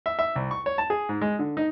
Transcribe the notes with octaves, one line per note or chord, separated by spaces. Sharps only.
E5
E5
C2
C#6
C#5
A5
G#4
G#2
G#3
D3
D#4